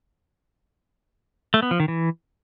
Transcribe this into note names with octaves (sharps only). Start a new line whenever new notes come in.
A3
B3
F3
D#3
E3